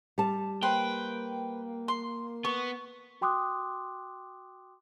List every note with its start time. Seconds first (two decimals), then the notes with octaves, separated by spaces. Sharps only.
0.18 G3 A5
0.63 A#3 B4 C5 G5
1.88 C6
2.45 B3 C#6
3.21 F#4 G5 C6 D6 D#6 F#6